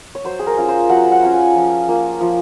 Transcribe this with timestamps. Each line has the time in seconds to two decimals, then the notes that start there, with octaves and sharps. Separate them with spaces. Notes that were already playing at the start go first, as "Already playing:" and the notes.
0.15 C#5
0.24 F#3 C5
0.39 G#4
0.47 A#4
0.57 C#4 F4
0.69 C5
0.89 F#3 F#5
1.12 F#5
1.22 C#4 F4
1.34 G#5
1.55 F3
1.88 A#3 F4
2.21 F3